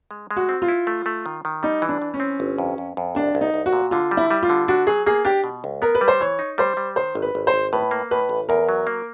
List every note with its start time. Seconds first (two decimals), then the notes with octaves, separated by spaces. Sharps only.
0.11 G#3
0.31 G#3
0.37 F#4
0.49 C4
0.62 F4
0.68 E4
0.87 A3
1.06 A3
1.26 D#3
1.45 D#3
1.63 G3 D#4
1.82 E3
1.89 D4
2.02 E3
2.14 C#4
2.20 C4
2.40 G1
2.58 F2
2.78 F2
2.97 F2
3.15 C2 D4
3.35 C2
3.41 D#4
3.54 C2
3.66 F#4
3.73 A#2
3.91 D3 F4
4.11 G3
4.17 E4
4.31 G3
4.43 F4
4.49 D3
4.68 D4 F#4
4.87 F#3 G#4
5.06 A#3 G#4
5.25 D4 G4
5.44 B2
5.64 C#2
5.82 B3 A#4
5.95 B4
6.01 G3
6.08 C5
6.21 E3 C#5
6.39 D#4
6.58 G3 C5
6.77 G3
6.96 D#3 C5
7.15 G#1
7.22 B4
7.35 G#1
7.47 C5
7.54 G#1
7.73 A2 B4
7.91 A#3
8.11 A2 B4
8.29 A1
8.49 E2 A#4
8.69 F#3
8.87 A#3